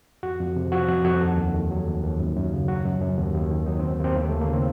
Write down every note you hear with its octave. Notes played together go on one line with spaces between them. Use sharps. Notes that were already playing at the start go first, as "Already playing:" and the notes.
F2 F#4
F2
C3
F3 F#4
F2 F#4
F2 F#4
D#2 A4
D#2
D#3
F#3
D#2
D#2
F#2
F#2
C#3
F#3 F#4
F#2
F#2
D#2
D#2
D#3
F#3 D#4
C4
D#2
D#2 C4
D#2 A#3
A3
D#2
A#3
C#3
C4